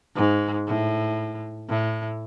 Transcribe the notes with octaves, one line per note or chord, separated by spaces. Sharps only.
G#2
A2
A2